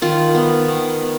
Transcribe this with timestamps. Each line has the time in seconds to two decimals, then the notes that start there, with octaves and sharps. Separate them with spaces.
0.02 D#3 F4
0.35 B3
0.68 D#3
1.02 B3